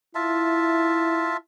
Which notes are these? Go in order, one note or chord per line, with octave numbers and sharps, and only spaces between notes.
E4 F4 E5 A5